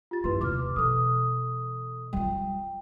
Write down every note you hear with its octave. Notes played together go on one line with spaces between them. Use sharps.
F4 G4 A6
F#2 A3 E4 B4 C6
D#2 C3 D6 F6
B2 E3 A4 D#6
G3 F4 G5